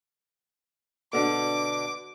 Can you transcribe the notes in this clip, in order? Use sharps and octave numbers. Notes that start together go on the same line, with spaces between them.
B2 D3 D4 D6